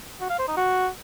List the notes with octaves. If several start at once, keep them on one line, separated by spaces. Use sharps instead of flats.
F#4
F5
C5
D#4
F#4